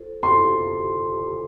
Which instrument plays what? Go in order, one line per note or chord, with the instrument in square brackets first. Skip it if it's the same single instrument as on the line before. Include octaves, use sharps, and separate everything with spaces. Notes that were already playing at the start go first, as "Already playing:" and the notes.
Already playing: [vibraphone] F4 A4 C5
[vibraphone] F4 A4 C5 [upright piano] C6